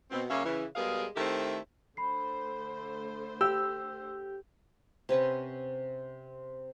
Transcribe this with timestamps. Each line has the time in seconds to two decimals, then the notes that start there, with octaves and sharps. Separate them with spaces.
0.11 B2 C4
0.29 F#2 C#3 A#3 C#4 E5 F5
0.44 C#3 E3
0.76 B2 G3 G#3 G#4 A#4 F5
1.16 D#3 A3 C4 E4 G4 A4
1.97 D3 A3 C5 B5 C7
3.41 G4 E6
5.09 C3 C#4 B4 F#5